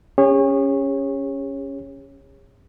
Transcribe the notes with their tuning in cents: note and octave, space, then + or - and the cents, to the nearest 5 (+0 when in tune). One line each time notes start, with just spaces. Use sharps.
C#4 +0 G#4 -45 C#5 -15